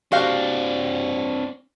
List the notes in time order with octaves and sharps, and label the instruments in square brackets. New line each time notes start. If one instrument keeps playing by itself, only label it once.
[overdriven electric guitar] C4 D4 [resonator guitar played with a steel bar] F#4 G4 F5